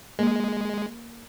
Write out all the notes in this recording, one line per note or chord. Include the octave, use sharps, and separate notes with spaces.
G#3 A#3